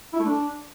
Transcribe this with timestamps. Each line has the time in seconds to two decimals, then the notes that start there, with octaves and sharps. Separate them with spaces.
0.13 E4
0.19 A3
0.26 D4